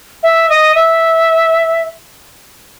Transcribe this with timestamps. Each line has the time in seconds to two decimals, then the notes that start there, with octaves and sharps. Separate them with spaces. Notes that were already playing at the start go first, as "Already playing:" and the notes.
0.23 E5
0.49 D#5
0.75 E5